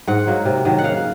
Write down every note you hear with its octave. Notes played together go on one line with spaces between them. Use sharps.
G#2 F#5
F#3 A#3
C3
D#3 F#3
F#5
C#3 F5